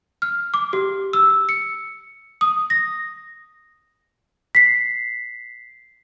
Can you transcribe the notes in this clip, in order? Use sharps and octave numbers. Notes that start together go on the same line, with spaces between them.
F6
D6
G4
E6
C#7
D#6
A#6
B6 C7